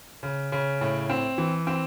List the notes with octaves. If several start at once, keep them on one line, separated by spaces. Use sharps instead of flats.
C#3
C#3
A2
C4
E3
C4